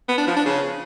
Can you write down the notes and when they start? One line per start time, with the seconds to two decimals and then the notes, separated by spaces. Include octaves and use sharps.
0.09 B3
0.18 D4
0.27 F3
0.36 D4
0.46 C#3